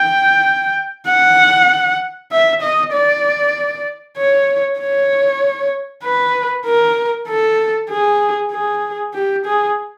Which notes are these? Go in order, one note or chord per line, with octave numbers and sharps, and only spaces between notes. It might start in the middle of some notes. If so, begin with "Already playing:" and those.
Already playing: G5
F#5
E5
D#5
D5
C#5
C#5
B4
A#4
A4
G#4
G#4
G4
G#4